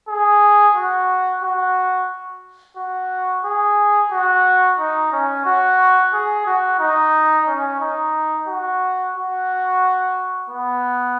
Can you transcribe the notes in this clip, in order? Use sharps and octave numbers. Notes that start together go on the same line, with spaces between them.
G#4
F#4
F#4
F#4
G#4
F#4
D#4
C#4
F#4
G#4
F#4
D#4
C#4
D#4
F#4
F#4
B3